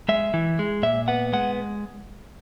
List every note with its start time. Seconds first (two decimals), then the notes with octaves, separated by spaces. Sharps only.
0.09 G#3 E5
0.34 E3
0.59 G#3
0.83 A#2 E5
1.08 B3 F#5
1.33 G#3 F#5